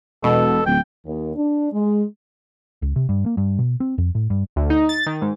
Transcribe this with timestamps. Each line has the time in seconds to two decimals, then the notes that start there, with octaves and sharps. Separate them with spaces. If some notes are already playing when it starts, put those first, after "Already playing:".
0.24 E1 B2 A4
0.66 D1 G5
1.05 D#2
1.36 D4
1.72 G#3
2.82 C#2
2.96 C3
3.09 G2
3.26 A#3
3.37 G2
3.59 B2
3.80 C4
3.98 F2
4.15 A2
4.30 G2
4.56 D2
4.70 D#4
4.89 A6
5.06 D#3
5.22 G#2